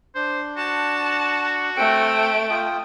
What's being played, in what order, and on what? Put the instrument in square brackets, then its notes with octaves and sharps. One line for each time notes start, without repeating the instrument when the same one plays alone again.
[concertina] D4 [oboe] C5
[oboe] F#4 [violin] A5
[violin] A3 D7 [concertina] C4 A4 G5
[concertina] F4 G5 D#6